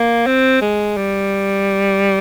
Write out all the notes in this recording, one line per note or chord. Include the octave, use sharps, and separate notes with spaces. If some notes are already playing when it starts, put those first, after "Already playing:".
Already playing: A#3
C4
G#3
G3